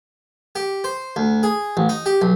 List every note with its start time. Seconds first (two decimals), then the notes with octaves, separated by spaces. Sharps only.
0.56 G4
0.84 C5
1.16 D2
1.43 G#4
1.77 A1
1.89 D#4
2.06 G4
2.22 B1